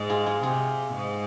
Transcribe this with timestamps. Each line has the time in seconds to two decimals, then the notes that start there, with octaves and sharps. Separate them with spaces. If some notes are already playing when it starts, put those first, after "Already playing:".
Already playing: G#2 G#3
0.10 F4 G#4
0.26 F4 G#4
0.43 C3 F4 G#4
0.94 G#2 G#3